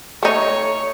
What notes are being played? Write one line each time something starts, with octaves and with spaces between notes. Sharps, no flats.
A3 D#4 C#5